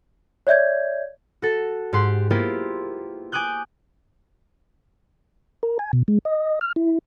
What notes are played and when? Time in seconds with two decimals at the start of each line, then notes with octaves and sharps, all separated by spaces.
0.47 C#5 D5 E5 G6 G#6
1.42 F#4 A4
1.93 G#2 G4 C6 F#6
2.30 A#3 B3 E4 F4 G4 C5
3.32 G#5 D6 D#6 F#6 G6
5.63 A#4
5.79 G#5
5.93 B2
6.08 G#3
6.25 D#5
6.61 F6
6.76 E4